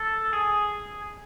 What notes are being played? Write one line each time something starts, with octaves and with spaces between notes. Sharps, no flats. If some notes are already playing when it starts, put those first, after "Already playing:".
Already playing: A4
G#4